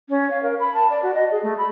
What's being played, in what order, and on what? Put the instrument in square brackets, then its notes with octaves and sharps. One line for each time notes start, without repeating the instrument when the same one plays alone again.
[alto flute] C#4
F5
A#4
B5
A5
D5
F#4
D#5
G#4
A3
B5